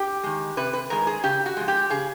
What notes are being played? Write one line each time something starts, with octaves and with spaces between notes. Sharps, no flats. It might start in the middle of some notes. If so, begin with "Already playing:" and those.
Already playing: G4
D#3 G#3
C3 B4
B4
D#3 G#3 A#4
G#4
C#3 G4
F#4
F3 G#3
G4
C#3 G#4